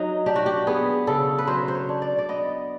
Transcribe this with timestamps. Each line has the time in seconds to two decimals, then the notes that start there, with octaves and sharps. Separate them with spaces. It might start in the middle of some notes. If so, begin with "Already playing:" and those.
Already playing: F#3 D#4
0.26 D4 G4
0.36 F#4
0.46 G4
0.67 B3 G#4
1.07 C#3 A4
1.38 B4
1.47 F#3 C5
1.68 C5
1.75 C#5
1.89 D4
2.02 D5
2.18 D5
2.29 B3 D#5